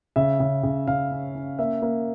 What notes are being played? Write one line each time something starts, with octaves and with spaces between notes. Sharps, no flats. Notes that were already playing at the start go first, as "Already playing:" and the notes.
C#3 E5
C#3
C#3
C#3 F5
C#4
C#4
A#3 E5
A#3